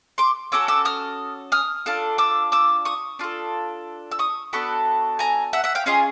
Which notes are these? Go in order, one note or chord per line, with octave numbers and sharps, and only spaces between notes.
C6 D6
C#4 F#4 A4 D6 E6
D6 E6
D#6 F6
D#6 F6
D4 F4 A4
D6 E6
D6 E6
C#6 D#6
D4 F4 A4
E6
C#6 D#6
B3 D4 F#4 A4 B5 C#6
G#5 A#5
E5 F#5
E5 F#5
F5 G5
C#4 F4 G#4 D#5 F5